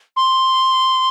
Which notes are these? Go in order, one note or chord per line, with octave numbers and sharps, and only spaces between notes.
C6